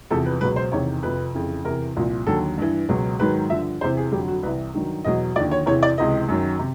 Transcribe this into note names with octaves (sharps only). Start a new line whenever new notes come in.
E2 C3 F3 A4
B4
C#2 B2 F#3 B4
C5
E2 C3 D#3 C#5
F2 C3 F3 B4
F2 C#3 E3
E2 C3 E3 A#4
C2 A#2 F3
D#2 D3 F#3 A4
G2 E3
C#2 B2 F#3
G#2 D#3 F#3 B4
G2 D3 F3 E5
E2 C3 E3 C5
G#4
F2 D3 F#3 G4
F#4
C2 C3 E3 B4
G2 D#3 F#3
E2 B2 F#3 D#5
D#2 D3 F3 D5
C#5
E2 C3 E3 C#5
D5
C#2 C3 E3 D#5
F#2 D#3 F#3
C3